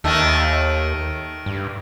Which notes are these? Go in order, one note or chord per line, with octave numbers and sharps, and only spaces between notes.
D#2 D#3 A3
G2